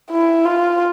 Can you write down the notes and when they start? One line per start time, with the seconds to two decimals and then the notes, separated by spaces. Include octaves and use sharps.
0.10 E4
0.45 F4